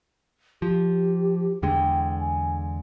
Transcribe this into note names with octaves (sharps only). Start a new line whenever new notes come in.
F3 G4
E2 D3 G#3 G5
G#5